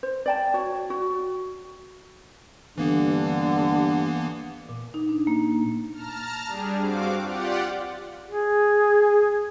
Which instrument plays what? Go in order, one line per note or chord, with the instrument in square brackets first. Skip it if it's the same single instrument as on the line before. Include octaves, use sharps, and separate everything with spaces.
[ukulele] C5
D5 G5 A5
F#4 C#5
F#4
[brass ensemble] G2 D3 [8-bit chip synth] E3 A#3 B3
[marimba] A#2
D#4
D4
A#3
[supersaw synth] A5 A#5 F6
G3 D4 G#4
G2 C4 F#4 F5 D6
F4 G4 D5 F#5
[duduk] G#4